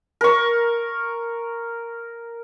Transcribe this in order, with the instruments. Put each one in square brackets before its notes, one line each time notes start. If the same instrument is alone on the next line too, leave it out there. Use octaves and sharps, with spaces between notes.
[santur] A#4 C#6